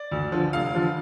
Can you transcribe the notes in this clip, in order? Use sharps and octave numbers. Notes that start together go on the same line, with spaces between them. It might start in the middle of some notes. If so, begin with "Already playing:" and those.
Already playing: D5
D2
D3 F3
F1 F5
D3 F3